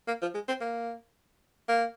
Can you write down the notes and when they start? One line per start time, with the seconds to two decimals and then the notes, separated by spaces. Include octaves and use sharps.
0.08 A#3
0.22 F3
0.35 G#3
0.48 C4
0.61 A#3
1.68 A#3